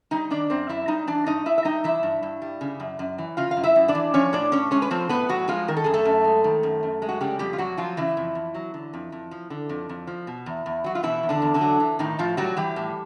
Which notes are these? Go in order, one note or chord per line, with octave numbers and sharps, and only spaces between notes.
G3 D#4 D#5
D#3 D4 D5
F#2 C4 C5
F#2 E4 E5
G3 D#4 D#5
E3 D4 D5
G2 D#4 D#5
G2 E4 E5
E5
G3 D#4 D#5
E3 E4 E5
G2
G2
G3
C#3
F#2
F#2
E3
C#3 F4 F5
F5
F#2
E4 E5
F#2
D4 D5
E3
F3 C#4 C#5
A2 D4 D5
A2 C#4 C#5
G#3 C#4 C#5
B4
F3 C4 C5
A2 B3 B4
A2 F#3 F#4
F3 G#3 F4
D#3 A#4
A4
F#2 G#4
A3 A4
F#2
G#3
D#3
F#2
F#2
G#3
F#4
C#3 G3 G4
F2 G3 G4
F4
F2 F#3 F#4
F3 F#3 F4
C#3 E3 E4
F2
F2
F#3
D3
F2
F2
F3
D3
F2
F2
F3
B2
E2
E2
F#3 F#4
F4
B2 E3 E4
E2
D3 D4
E2
D3 D4
F#3
E3
A2 D#3 D#4
A2 F3 F4
F#3 G3 F#4
E3 G3 G4
A2